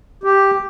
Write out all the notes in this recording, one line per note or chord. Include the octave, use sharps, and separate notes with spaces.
G4